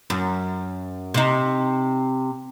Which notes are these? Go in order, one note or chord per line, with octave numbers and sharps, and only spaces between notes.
F#2
C3 D#4